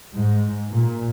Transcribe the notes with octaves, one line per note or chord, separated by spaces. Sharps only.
G#2
A#2